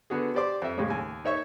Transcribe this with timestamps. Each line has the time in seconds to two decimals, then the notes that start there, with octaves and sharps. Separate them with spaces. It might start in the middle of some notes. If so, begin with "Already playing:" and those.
0.10 D3 B3 F#4 G#4
0.35 G4 C5 D5 C6 D6
0.62 F2 E5
0.78 A2 C#3 G3 G#3
0.90 D#2 G#5
1.25 D#4 C#5 E5 C#6